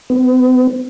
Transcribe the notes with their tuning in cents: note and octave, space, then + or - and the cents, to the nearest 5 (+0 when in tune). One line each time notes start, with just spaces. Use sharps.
B3 +45